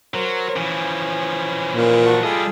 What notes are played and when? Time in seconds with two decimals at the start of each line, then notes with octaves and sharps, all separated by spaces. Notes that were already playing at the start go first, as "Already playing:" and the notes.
0.14 F#3 A#4 C5
0.56 E3 F3 C#4
1.72 A#2
2.06 F#4 A5 C#6
2.23 G3 F4 G#4 A4 D#5